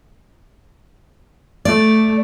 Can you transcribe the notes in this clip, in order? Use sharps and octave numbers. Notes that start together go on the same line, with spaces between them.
A3 D5